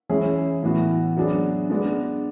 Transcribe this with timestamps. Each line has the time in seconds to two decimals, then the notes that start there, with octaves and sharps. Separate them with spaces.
0.09 E3 G#3 C#4 E4 G#4
0.63 A2 E3 B3 F#4
1.17 F#3 B3 D4 G#4
1.70 G#3 B3 D4